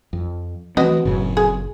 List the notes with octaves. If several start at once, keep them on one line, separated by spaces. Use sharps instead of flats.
F2
E3 F3 A3 B3 C4 F#4 D#5
F#1 F#2 A2 C#3 F#3
G#4